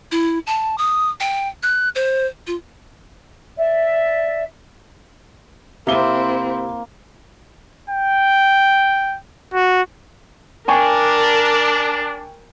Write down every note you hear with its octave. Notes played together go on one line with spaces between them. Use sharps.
E4
A5
D#6
G5
F#6
C5
F4
D5 E5
C3 A#3 C4 E4 E5 G7
G5
F#4
D4 A#4 G5 G#5 C#6